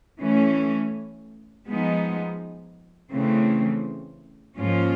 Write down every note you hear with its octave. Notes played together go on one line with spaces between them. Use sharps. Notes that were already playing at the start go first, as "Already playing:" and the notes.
E3 A3 C#4
F3 G#3 B3 D#4
C#3 E3 A3 C4
G#2 F3 A#3 C#4 F4